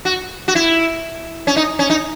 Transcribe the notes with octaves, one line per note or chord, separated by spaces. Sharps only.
F#4
F#4
E4
C#4
D#4
C#4
D#4